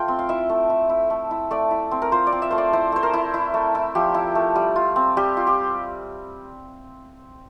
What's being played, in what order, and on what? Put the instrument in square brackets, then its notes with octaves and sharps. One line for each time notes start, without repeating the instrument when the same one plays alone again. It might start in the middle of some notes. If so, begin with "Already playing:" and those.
Already playing: [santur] A3 F4 G5
C4
F5
E4 E5
A3
E4
E4
A3
E4
A3 D5
E4
C4
A#4
F4 C5
D5
C4
E5
A3 C5
D5
E4 C5
A3 C5
A#4
E4
E4
A3
E4
F3 G4
E4
A3
G3
F4
C4
G3 G4
F4
G4